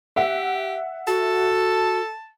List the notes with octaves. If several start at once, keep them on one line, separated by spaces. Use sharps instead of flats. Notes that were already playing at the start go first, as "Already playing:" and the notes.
G4 E5 F#5
F#4 A4 A5